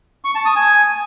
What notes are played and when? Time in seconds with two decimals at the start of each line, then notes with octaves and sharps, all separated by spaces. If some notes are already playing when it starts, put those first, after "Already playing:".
0.25 C#6
0.35 A5
0.45 D#6
0.56 G#5